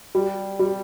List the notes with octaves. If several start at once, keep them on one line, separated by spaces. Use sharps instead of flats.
G3
G3